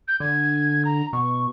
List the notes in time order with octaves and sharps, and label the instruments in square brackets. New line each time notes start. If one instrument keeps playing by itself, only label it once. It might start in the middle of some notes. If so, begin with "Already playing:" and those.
[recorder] G6
[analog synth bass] D3 [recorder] G#6
[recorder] A#5
[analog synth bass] B2 [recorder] C#6